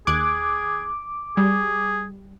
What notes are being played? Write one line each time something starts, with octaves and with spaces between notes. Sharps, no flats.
D#2 G#4 D6 F#6 G#6
G3 G#4